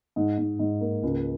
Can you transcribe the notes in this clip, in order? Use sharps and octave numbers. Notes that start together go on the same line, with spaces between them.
G#2
G#2
G#2
A#3
C#2